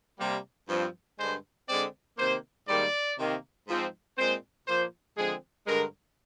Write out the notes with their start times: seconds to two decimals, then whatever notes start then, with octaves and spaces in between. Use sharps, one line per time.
0.19 C3 G3 A#3
0.69 G2 F3 C4
1.18 G2 D3 G#3 C5
1.69 D3 G#3 C4 D5
2.18 C3 D#3 A#3 C5
2.68 G#2 D#3 G3 A#3 D5
3.18 C3 D#3 A#3
3.68 G#2 F3 C4
4.17 A#2 G#3 C4 C5
4.67 A#2 F3 A#3 C5
5.17 D3 F3 G#3 C4 G#4
5.67 G2 D3 G#3 A#4